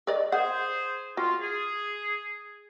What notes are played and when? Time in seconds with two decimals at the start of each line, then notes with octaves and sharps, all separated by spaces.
0.07 A#4 D5 D#5
0.32 G#4 C5 F#5
1.17 F4 F#4
1.41 G#4